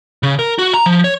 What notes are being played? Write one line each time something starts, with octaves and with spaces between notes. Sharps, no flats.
C#3
A#4
F#4
A#5
F3
C#5